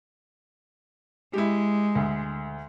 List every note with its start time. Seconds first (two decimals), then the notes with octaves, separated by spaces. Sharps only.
1.33 G#3 E4 G4
1.95 D2